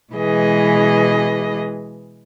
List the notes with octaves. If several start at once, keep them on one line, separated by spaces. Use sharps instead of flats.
B2 E3 G#3 G#4 B4 D#5